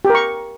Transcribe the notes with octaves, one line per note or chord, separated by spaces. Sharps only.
G4
A#4
C#6